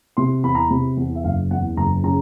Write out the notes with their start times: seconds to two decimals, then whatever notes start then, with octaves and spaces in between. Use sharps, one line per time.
0.17 C3 C6
0.43 E2 B5
0.55 A#5
0.65 B5
0.70 C3
0.97 E2
1.15 E5
1.24 F#1 F5
1.51 E2 F#5
1.77 F#1 A#5
2.03 C#3 A#5